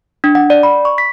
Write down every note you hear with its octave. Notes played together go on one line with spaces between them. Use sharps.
D4
F#5
D5
B5
C#6
B6